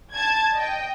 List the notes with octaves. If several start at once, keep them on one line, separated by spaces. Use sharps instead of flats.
A5 G#6
D#5 G5